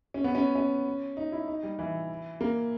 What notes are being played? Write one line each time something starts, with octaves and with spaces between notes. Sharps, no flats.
C#4
B3
C#4
C#4
D#4
E4
D#4
G3
E3
A#3